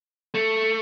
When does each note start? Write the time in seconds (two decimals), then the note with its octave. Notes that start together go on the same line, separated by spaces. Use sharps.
0.34 A3 C#7